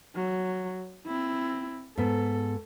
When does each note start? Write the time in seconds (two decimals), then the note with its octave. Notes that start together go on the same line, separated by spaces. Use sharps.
0.16 F#3
1.06 C4 E4
1.97 G#2 B3 A4